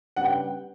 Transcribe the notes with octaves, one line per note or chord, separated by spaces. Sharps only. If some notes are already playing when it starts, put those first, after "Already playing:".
C#3 G3 B3 D4 F#5
G5